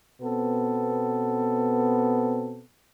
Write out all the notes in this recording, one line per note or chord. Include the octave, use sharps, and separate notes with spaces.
B2 B3 C4 A4